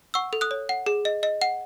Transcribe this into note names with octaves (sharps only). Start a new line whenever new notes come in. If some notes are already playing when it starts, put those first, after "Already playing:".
F#5 C#6 E6
A4
D#6 F#6
C#5
F#5
G#4
D#5
D#5
F#5